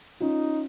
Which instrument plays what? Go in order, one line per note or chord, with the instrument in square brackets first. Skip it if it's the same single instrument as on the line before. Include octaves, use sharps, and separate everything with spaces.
[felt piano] C#4 F4 [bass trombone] D#4